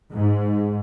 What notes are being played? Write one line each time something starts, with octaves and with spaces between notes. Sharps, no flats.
G#2